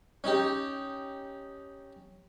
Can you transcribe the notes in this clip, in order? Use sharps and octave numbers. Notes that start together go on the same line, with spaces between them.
C#4 D#4 G4